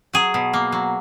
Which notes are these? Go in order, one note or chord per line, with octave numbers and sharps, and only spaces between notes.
F#3 G#4
B2
A#3
F#3